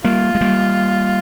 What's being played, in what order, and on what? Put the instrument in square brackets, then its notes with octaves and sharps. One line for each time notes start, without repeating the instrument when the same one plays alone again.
[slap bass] G3 A#3 [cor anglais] F4
[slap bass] G#3
G3 A#3